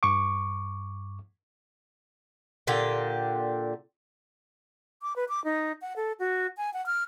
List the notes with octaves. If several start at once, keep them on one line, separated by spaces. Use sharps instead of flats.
G2 C#6 D6
A#2 D3 G4
D6
B4
D6
D#4
F#5
A4
F#4
G#5
F#5
F6